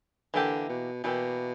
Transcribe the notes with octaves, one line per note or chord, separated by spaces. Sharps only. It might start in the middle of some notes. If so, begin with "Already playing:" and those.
D3 E3 A#3 E4 G4
B2
B2 E3 A#3 E4 G4